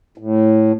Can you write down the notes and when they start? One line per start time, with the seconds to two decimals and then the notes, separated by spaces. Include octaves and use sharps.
0.18 A2